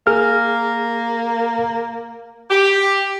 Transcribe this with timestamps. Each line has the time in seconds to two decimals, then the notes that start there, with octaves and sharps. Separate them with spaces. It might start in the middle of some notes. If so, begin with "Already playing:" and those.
0.07 A#3 G#4 F6
2.50 G4